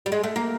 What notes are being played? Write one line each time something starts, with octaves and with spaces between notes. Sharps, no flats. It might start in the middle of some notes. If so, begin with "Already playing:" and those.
G3
G#3
A3
A#3